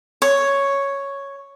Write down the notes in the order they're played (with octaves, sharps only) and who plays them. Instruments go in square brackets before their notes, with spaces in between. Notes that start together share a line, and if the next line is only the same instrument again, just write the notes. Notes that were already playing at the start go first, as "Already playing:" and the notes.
[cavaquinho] C#5